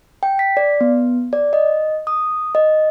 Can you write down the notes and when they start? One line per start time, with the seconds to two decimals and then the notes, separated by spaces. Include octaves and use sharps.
0.23 G5
0.39 B6
0.57 D5
0.81 B3
1.33 D5
1.53 D#5
2.07 D#6
2.55 D#5